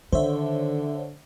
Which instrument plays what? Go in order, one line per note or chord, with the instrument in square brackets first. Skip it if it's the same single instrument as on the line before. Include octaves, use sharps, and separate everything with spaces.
[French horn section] D3 [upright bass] D#3 [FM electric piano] C5 C#5 E5